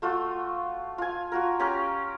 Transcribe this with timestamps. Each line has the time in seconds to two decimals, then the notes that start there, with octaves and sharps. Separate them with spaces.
0.02 A3 F4 F#4
0.98 F4 G#5
1.32 F4 F#4 A#4
1.60 C#4 G4 A#4